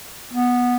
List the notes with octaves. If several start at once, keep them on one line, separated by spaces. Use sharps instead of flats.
B3